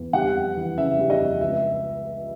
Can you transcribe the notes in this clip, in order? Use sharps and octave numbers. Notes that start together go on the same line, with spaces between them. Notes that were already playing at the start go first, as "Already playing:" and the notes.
Already playing: E2
G3 F#5
F2
E3
C#3 E5
G3
D#5
F2
C#2 E5